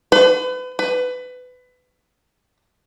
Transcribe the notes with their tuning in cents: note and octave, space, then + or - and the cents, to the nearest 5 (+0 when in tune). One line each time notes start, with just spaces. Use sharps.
B4 +35
B4 +20